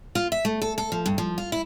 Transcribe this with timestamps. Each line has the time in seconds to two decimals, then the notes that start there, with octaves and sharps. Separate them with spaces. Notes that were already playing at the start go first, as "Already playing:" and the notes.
0.15 F4
0.32 E5
0.45 A3
0.62 A4
0.78 A4
0.92 F3
1.06 G2
1.18 F3
1.38 F4
1.52 E4